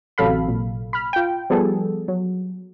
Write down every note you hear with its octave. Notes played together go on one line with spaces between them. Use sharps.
A1 C3 F#3 A4 F5 B5
A#2
B5 F6
F4 G5
F3 G3 B3 G#4 A4
F#3